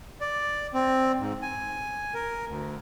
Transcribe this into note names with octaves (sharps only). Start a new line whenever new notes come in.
D5
C4
G#2
G#5
A#4
D2